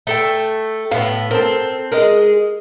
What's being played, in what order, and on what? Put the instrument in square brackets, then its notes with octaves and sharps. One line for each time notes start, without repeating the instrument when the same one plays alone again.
[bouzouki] A3 A4 G5
[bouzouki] A2 B3 [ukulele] F5
[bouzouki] C4 [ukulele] A4 A#4
[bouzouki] G#3 G#4 [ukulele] A#4 D#5